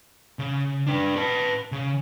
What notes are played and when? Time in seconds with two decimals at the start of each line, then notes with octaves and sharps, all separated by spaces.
0.39 C#3
0.87 D4 B4
1.16 B4 A5
1.72 C#3